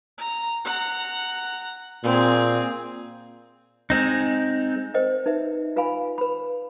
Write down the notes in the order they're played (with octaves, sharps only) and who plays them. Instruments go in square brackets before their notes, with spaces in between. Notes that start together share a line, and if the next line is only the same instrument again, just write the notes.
[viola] A#5
F#5 A#5
[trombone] A#2 [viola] C4 G#4
[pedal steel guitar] G#3 C4 D#4
[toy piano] A#4 C5 D#5 G5
D#4 B4 E5
F4 B4 F5 G#5 B5
B4 B5